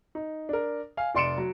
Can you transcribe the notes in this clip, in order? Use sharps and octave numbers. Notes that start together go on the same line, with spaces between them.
D#4
D4 A#4
F5 G#5
F1 D5 C6 C#7 D7 E7
F#3